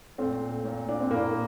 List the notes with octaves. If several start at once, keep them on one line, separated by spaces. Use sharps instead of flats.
A#2 A3 C4
A#2
D4
C4
A2 A#3